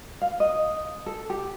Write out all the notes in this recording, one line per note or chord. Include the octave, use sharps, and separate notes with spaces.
F5
D#5
A4
G4